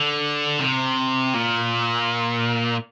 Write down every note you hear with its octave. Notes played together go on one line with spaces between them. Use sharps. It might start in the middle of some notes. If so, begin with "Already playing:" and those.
Already playing: D3
C3
A#2